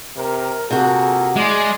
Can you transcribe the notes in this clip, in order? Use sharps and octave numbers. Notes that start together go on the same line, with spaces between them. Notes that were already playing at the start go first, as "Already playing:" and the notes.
C3 A#4
C3 A#3 F4 F#4 G#4 A4
G#3 E4 D5 C6